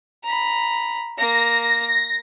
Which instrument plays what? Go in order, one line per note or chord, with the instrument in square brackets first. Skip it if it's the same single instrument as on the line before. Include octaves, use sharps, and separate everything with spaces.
[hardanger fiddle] A#5 B5
[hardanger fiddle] A#3 [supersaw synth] A#6